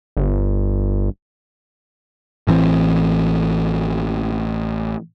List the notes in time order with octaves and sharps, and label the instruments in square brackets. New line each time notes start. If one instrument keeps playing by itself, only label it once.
[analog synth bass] G1
[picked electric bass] A1 E3 B3 C4